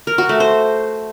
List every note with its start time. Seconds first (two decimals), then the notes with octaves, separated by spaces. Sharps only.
0.07 A#4
0.18 F#4
0.29 A3
0.40 C5